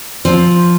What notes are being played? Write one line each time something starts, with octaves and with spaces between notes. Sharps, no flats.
F3 C4